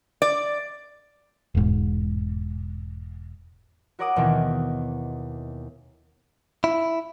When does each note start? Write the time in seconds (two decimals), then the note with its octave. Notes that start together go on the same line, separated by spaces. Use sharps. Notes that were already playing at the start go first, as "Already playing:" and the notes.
0.22 D5
1.55 E1 G#2
3.99 F#4 A#4 C#5 F#5 D6 D#6
4.16 D#2 B2 D#3 E3 C4
6.64 E4